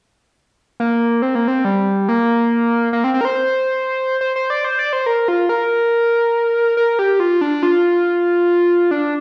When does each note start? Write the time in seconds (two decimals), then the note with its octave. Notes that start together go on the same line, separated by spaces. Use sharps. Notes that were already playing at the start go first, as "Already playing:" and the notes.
0.80 A#3
1.22 C4
1.35 A#3
1.48 C4
1.65 G3
2.09 A#3
2.93 A#3
3.04 C4
3.14 C4
3.21 A#4
3.25 C5
4.21 C5
4.36 C5
4.50 D5
4.64 C5
4.79 D5
4.93 C5
5.06 A#4
5.28 F4
5.49 A#4
6.77 A#4
6.99 G4
7.20 F4
7.41 D4
7.63 F4
8.91 D4